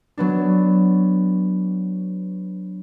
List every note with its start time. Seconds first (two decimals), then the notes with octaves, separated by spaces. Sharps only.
0.18 F#3 B3 D4